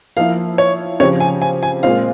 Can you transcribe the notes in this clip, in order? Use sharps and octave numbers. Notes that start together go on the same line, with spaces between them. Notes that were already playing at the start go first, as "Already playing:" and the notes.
F3 A#3 E4 F5
C#5
C#3 F3 C4 G4 C#5
G#5
G#5
G#5
A#2 G#3 C4 F4 F5